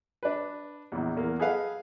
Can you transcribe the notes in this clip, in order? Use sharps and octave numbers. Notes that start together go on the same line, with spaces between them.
D4 B4
A#1 E2
E2 A#3
G#4 A4 B4 D#5 F5 F#5